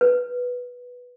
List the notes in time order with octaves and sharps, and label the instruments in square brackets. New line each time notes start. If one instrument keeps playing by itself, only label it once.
[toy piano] B4